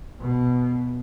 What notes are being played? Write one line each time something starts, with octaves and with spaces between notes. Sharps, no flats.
B2